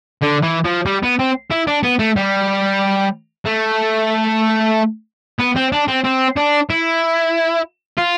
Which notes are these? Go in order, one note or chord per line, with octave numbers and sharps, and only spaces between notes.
D3
E3
F3
G3
B3
C4
E4
D4
B3
A3
G3
A3
B3
C4
D4
C4
C4
D4
E4
F4